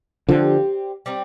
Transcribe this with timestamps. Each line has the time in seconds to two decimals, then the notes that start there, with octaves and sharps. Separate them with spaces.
0.29 D3 F3 G3 C4 D#4 G4
1.06 G3 C4 D#4